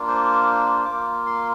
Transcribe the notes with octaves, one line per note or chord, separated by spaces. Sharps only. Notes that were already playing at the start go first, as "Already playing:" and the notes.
Already playing: A#3 D4 F4
C5
A#3 F4 D6
C6